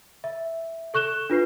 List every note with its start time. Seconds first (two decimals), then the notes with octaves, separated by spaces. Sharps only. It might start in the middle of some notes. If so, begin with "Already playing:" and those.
0.24 E5
0.94 A4 C#6 F#6 E7 G7
1.30 D4 F4 B4 C7